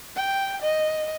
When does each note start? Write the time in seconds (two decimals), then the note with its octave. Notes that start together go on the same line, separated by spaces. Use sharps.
0.17 G5
0.62 D#5